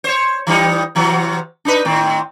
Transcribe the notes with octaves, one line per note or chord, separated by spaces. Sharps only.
C5 C#5
E3 G3 D#4
C3 E3 F#3
D4 D#4 B4
A2 D#3 C4